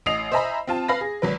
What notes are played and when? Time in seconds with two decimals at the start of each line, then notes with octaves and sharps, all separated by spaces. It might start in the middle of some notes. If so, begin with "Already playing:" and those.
0.06 A1 D#5 D#6 C7 F7
0.32 C5 D#5 E5 G#5 A#5 B5
0.67 C4 F4 A5
0.88 B4 F5 B5 A#6
1.01 G#4
1.22 G#1 F#3 B4